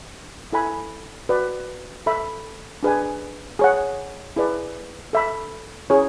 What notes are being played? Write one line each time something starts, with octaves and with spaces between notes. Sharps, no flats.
E4 A4 E5 G#5 B5
F#4 B4 D5
A4 E5 B5
D4 G#4 B4 D5 G#5
G#4 C#5 F#5
E4 G#4 B4 D5
A4 E5 B5
C#4 E4 G#4 C#5